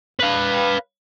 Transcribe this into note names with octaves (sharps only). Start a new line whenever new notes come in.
B4 F5